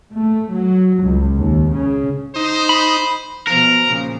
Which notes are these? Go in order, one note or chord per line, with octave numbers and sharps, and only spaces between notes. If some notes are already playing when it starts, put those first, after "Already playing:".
A3
F#3
C#2
D#2
C#3
D#4 C5
B5
B2 F3 A#4
A#2 C#3 F3